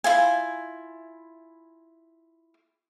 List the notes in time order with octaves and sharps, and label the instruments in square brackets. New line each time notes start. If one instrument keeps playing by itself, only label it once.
[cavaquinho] E4 F4 G#5